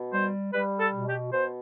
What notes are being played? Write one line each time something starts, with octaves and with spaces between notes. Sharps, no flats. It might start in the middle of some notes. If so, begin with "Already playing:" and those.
Already playing: B2
G3 C5
G3 B4
A4
B2
G4
B2 C5